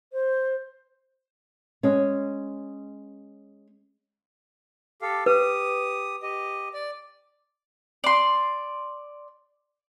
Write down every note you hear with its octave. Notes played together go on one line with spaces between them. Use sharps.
C5
G#3 C#4
G4 A4 F5
G4 B4 D#6
G4 D#5
D5
D5 C6